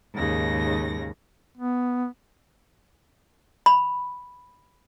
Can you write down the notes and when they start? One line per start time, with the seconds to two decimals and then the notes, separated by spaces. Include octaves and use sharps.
0.13 D#2 G#2 C#3 A#6
1.57 B3
3.66 B5